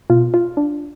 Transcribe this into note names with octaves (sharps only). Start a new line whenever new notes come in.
B2 F4
F4
D4